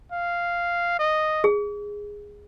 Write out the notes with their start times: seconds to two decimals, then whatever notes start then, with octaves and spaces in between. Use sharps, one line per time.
0.12 F5
0.99 D#5
1.44 G#4